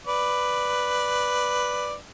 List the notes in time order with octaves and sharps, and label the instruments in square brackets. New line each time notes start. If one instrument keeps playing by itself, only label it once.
[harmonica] B4 D5